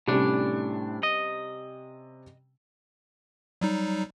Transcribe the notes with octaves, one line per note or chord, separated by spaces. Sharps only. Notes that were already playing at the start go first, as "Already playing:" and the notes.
A2 C3 G3 C#4 D4
D#5
F#3 G3 D#4